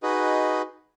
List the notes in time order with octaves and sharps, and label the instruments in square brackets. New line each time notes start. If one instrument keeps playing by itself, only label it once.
[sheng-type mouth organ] D#4 F#4 G#4 B4 D#5